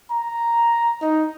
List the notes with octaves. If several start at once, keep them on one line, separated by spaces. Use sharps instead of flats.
A#5
D#4